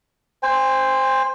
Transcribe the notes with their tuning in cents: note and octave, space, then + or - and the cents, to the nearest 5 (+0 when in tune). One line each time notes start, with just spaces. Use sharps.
C5 +0 G#5 -45